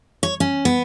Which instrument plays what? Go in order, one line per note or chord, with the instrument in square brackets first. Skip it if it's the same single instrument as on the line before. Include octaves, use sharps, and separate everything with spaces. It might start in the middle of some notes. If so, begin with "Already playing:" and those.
[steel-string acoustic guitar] C#5
C#4
B3